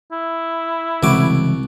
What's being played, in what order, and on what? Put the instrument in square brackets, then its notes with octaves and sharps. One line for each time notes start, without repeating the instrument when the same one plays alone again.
[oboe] E4
[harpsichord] C2 F#4 D6 [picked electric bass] C#3 E3 G#3